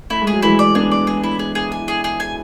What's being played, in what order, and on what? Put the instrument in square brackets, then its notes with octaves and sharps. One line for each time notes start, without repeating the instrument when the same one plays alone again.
[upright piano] A3 [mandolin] E4
[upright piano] G#3
[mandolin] G#4
[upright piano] F#3
[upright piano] E3 G#3 [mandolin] E4
[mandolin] D5
[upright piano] B3 D4 [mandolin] G#4
[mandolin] D5
G#4
E4
G#4
G#4
G#5
G#4
G#4
G#5